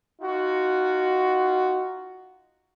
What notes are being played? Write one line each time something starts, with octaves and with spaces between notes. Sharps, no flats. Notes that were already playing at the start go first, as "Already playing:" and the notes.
D#4 F4 F#4